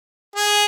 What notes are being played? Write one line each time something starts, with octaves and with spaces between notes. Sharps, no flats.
G#4